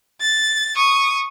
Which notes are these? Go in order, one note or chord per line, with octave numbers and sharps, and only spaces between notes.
A6
C#6 D#6